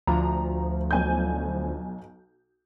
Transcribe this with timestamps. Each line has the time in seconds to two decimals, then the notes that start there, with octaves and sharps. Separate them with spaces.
0.07 D2 F3 A#5
0.91 B1 G#5 G6